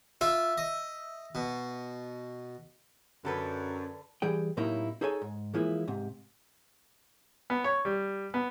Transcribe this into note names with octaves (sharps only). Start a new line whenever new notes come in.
F4 E5
D#5
B2
F#2 D3 A4 B4
E3 G3 G#4 G5
A2 C3 F#3 A#3 D#4 E4
D#4 G#4 A4 C#5 F5 G#5
G#2
E3 F3 G#3 A#3 E4
G#2 C3
B3
C#5
G3
B3